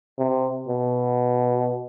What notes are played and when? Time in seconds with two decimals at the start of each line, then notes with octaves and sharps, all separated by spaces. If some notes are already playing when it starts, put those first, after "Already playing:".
0.18 C3
0.68 B2